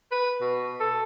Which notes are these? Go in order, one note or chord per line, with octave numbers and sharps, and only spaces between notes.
B4
B2
A4